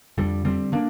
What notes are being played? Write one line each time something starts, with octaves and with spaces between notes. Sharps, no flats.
F2 D3 G3
D3 G3 C4
D3 A#3 D4